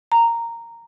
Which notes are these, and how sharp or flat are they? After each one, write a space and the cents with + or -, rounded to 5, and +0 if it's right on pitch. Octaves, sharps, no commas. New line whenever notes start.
A#5 -10